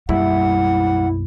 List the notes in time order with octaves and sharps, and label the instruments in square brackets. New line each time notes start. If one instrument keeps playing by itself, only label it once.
[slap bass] B1 F#2 A#3 [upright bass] G3 [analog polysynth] E4 [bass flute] F#5